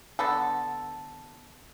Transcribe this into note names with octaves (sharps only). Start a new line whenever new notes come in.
D3 B3 A4